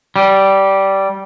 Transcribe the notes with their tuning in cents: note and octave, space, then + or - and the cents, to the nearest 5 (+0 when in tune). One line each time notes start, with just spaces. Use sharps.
G3 -15